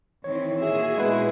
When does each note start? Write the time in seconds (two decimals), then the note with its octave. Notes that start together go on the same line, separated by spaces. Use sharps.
0.24 D#3 E3 C4 C#5
0.60 A#2 F#4 G#4 E5
0.98 G#3 B3 E4 B4